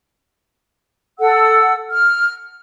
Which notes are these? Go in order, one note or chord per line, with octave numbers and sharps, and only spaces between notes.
A4 F#5 E6
F6